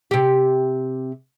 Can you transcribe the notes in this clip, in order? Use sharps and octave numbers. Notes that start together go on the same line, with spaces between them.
C3 G4